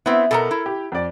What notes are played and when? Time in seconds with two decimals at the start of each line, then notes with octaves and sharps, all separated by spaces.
0.06 B3 C4 E4
0.31 B2 B3 A4 A#4 A#5
0.51 E4
0.66 G4
0.92 F2 D5